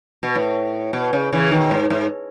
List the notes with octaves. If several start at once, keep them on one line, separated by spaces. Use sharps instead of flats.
B2
A2
B2
C#3
C#3 E3
B2 D#3
G#2
G#2